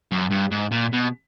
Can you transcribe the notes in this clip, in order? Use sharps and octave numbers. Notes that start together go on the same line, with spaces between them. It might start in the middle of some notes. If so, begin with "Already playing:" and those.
F#2
G2
G#2
A#2
B2